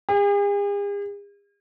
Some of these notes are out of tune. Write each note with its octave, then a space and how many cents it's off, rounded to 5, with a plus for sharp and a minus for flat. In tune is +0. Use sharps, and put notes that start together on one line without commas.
G#4 -45